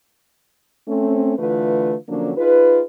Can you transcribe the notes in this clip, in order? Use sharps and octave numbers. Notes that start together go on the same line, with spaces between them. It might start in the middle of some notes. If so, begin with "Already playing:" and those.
A3 C4 C#4
D3 E3 A3 F4 B4
D3 F3 F#3 A#3 C#4 D4
D#4 F4 G#4 B4